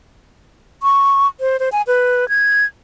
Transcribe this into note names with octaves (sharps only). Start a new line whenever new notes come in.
C#6
C5
C5
G#5
B4
G#6